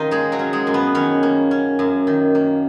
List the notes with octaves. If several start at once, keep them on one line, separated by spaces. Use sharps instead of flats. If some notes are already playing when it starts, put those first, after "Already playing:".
Already playing: D#3 C#4 D#4 F4 D#5 F5
G#3 A#3 G#4
F#3 F#4
C#4
G#3 G#4
F#2
B3 B4
D#3 C#4 C#5
A#3
C#4
F#2
D#3
A#3